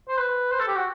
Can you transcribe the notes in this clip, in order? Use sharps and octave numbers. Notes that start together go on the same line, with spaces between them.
C5
B4
C5
A4
G4
F#4